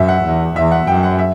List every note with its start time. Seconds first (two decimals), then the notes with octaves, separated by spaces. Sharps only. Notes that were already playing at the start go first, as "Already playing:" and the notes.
Already playing: F#2 E5
0.08 F#5
0.24 E2
0.56 E2 E5
0.71 F#5
0.87 F#2 G5
1.03 F#5
1.19 E5